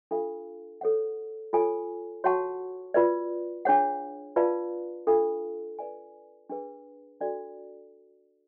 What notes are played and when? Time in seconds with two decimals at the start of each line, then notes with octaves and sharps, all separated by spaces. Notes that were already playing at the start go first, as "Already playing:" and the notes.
0.11 D4 F4 A4 F5
0.81 A4 C#5 F#5
1.53 F4 A4 C#5 G#5
2.24 F#4 C#5 F#5 A5 C#6
2.94 F4 B4 D5
3.65 D4 G#4 C#5 F#5
4.36 F4 B4 D5 F5 A5
5.07 D4 F4 A4 F5
5.79 B4 D5 G#5
6.50 D4 G#4 B4
7.21 D4 F#4 A4 D5